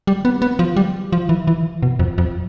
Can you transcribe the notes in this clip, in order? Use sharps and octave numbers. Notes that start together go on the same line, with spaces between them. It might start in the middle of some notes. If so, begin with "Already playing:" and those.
G3
B3
B3
F3
G3
F3
E3
E3
B2
F2
F2